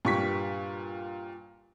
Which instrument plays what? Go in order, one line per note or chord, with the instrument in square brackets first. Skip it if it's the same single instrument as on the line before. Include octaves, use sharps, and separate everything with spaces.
[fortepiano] G2 [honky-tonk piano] A#2 C#6 B6